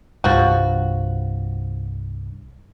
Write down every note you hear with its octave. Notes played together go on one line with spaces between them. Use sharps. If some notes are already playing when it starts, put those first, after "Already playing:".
C2 G2 F3 F#4